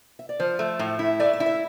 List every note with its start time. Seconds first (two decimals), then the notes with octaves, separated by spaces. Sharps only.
0.19 E5
0.29 D5
0.39 F3 C5
0.59 A3
0.79 A2
0.99 E4
1.20 A3 D5
1.33 E5
1.40 E4
1.46 E5